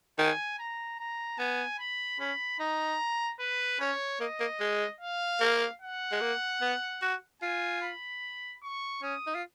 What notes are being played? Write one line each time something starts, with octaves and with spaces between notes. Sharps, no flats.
D#3 G#5
A#5
A#5
B3 G#5
B5
C#4 B5
D#4 A#5
B4
C#4 C#5
A#3 D#5
A#3
G#3
F5
A#3
F#5
G#3
A#3
B3
F#4
F4 G#5
B5
C#6
C#4 D#6
D#4
F4